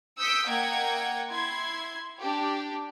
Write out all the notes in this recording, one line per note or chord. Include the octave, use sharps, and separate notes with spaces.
D#6 E6 G6 B6 C#7 D7
A#3 D#5 F#5 G5 G#6
E4 C6 G#6
D4 G4